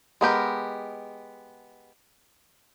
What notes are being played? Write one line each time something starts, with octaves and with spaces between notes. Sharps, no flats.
G#3 B3 G4 A#4